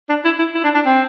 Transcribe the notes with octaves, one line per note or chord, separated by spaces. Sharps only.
D4
E4
E4
E4
D4
D4
C4